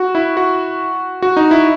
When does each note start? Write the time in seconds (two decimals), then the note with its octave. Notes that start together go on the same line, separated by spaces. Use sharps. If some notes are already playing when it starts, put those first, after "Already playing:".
Already playing: F#4
0.15 E4
0.37 F#4
1.22 F#4
1.37 D#4
1.51 E4